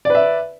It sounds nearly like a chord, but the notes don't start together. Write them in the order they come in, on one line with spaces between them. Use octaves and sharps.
D5 B4 E5